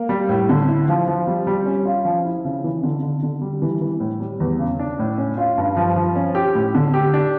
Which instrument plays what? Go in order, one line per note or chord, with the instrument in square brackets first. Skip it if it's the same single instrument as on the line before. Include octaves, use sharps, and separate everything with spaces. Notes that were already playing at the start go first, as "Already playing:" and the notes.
Already playing: [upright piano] A#3
G3
A2
D3
E4
F3
F3
G3
G3
C#4
F4
F3
E4
C#3
E3
D3
D3
D3
G3
E3
E3
A2
G3
E2
C#3
D4
A2
C#4
F4
G2
F3
F3
C#4
G4
A2
D3
G4
D4